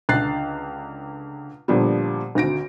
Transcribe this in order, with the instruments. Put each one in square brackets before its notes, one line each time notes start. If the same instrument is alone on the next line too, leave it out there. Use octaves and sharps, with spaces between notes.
[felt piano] C#2 D3 F#6 A6 C7
A#2 D3 F3 G3 B3
G#1 D2 A#6 D7